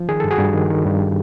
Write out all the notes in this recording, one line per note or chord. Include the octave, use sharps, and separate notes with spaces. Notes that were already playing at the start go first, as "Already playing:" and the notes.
Already playing: F3
D#3 G#4
G2 A4
F#4 G#4
G2
D#3
D#3
G2